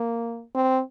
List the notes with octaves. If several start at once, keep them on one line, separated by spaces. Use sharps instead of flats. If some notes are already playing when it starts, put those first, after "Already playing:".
Already playing: A#3
C4